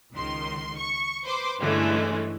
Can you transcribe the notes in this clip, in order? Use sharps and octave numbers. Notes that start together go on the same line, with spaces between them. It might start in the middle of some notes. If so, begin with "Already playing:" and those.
C#2 D#3 C6
C#6
B4 C5 C6 D6
G2 D3 E3 G#3 A3 C#4